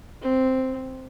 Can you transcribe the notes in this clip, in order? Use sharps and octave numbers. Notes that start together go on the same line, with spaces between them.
C4